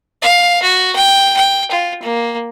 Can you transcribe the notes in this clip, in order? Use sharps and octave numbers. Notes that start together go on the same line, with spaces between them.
F5
F#4
G5
G5
F4
A#3